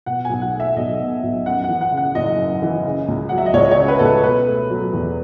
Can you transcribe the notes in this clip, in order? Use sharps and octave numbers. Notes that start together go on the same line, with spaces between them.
B2 F#5
B1 G#5
F#5
A3
E5
B1 D#5
B2
B1
F#2 F#5
E3 F#5
F#5
C#3
F#5
F#1 D#5
F#2
E3
C#3
C#2
F#3 F#5
E5
D#5
C#2 C#5
C#5
C#3
B4
C#2 A4
B4
B2 B4
A3
F#3
E2